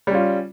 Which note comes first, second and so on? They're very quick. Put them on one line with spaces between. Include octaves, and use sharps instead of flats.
G3 C#4 F4